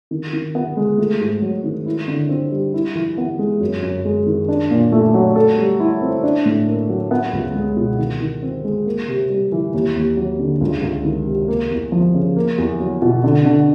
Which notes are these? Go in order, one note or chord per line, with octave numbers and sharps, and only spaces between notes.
D#3
D#3
B3
G#3
A3
G#2
F#3
D#3
E4
D3
C4
G3
E4
E3
B3
G#3
F#2
F#2
G#3
D#3
D4
A#2
A3
F#3
A4
G3
E4
C4
D4
A2
A#3
F#3
B3
C#2
G#3
B2
D#3
D#3
C4
G#3
A#3
C3
G3
E3
D#2
D#2
F#3
D3
C#2
C#2
D#3
C3
A#3
E2
F3
C#3
A#3
E2
F#3
B2
D3
D3